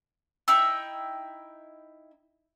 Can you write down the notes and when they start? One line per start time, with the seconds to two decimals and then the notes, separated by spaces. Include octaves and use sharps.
0.48 D#4 E4 G5 E6